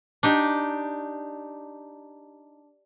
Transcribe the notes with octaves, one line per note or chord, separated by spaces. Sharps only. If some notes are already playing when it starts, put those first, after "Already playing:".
D4 D#4 G4